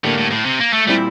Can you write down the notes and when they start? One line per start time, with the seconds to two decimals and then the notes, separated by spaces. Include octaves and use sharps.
0.04 A2 D3 G3 A#3
0.18 A2
0.31 A2
0.46 C3
0.60 A#3
0.73 A3
0.87 A#2 G3 A3 C4 E4